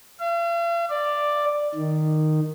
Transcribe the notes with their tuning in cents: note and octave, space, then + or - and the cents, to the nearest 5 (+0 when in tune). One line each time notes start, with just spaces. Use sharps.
F5 -45
D5 +5
D#3 -10